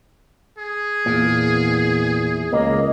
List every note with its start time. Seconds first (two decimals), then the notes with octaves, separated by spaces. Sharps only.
0.58 G#4
1.06 E2 A#2
2.52 C#2 A#3 D#5